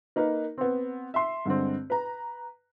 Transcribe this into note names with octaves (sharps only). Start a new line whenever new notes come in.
A#3 D#4 A#4 B4
B3 C4
E5 C6
G2 D3 G#3 C4
B4 A#5